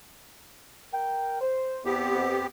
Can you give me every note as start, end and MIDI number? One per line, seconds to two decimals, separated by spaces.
0.93 1.39 70
0.93 1.39 79
1.41 1.80 72
1.85 2.13 40
1.85 2.47 59
1.85 2.47 60
1.85 2.47 67
2.15 2.39 41